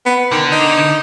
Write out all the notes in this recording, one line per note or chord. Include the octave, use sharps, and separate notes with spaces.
B3
D3 D#3
D#4